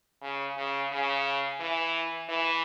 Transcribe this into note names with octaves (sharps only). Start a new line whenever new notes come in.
C#3
C#3
C#3
E3
E3